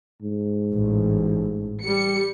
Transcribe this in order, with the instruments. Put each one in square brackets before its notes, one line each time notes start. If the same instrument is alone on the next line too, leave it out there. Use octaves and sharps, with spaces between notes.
[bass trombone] G#2
[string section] A1
G3 C#7